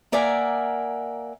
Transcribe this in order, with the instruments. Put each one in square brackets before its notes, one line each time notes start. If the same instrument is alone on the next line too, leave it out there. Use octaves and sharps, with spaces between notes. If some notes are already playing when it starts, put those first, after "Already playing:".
[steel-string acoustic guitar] A#3 A#4 D5 E5 F#5 G#5